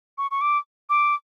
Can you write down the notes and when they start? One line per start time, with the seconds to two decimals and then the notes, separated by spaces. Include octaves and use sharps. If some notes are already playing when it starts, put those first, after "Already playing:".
0.18 C#6
0.31 C#6
0.41 D6
0.90 D6